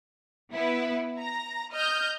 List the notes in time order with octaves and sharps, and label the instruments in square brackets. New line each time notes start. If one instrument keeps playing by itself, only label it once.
[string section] B3 E4 B4
A#5 A#6
D#5 F6 G6